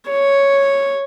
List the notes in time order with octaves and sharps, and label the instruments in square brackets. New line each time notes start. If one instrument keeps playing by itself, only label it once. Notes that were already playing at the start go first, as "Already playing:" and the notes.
[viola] C#5